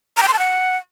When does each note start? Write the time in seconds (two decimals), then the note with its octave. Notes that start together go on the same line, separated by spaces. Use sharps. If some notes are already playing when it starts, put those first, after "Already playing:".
0.17 A#5
0.22 G5
0.28 C6
0.33 A5
0.39 F#5